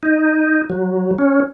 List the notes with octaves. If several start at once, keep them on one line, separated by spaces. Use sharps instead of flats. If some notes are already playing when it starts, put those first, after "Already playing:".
D#4
F#3
C#4